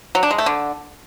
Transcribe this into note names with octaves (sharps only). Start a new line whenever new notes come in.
F#3
D4
G#3
A3
D3